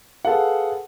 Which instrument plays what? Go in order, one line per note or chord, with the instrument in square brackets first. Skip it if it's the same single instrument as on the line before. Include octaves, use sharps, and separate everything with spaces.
[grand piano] G#4 A4 B4 F5 F#5